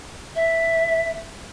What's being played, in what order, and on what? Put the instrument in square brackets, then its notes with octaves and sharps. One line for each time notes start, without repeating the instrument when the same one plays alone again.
[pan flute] E5